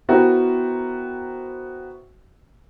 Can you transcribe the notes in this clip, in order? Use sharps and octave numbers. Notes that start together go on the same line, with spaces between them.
B3 E4 F#4 A#4 C5 G5